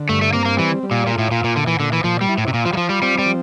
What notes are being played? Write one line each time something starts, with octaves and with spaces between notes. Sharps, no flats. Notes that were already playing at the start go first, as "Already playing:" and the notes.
Already playing: D3
G2 A3
A3
A#3 C4
A#3
E3 G3
G3
A#2
A#2 F4
A2
A#2 F4
A#2
A#2 D3
E3
A#2 D3
E3
A#2 F3
G3
E4
A2
C3
A#2 F4
F3
G3
F3 F4
G3
G3 C4
G3
F3